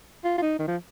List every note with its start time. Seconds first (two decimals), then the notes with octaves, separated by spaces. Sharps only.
0.24 F4
0.38 F4
0.42 D#4
0.59 D#3
0.67 F3